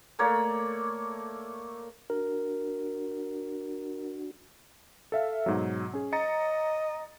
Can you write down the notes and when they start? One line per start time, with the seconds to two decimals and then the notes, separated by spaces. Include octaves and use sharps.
0.19 A3 A#3 C#5 D5
2.10 D4 F#4 A#4
5.12 A4 E5 F5
5.46 G#2 B2 F#3
5.93 C#4 G#4
6.13 D#5 A#5 A6 C#7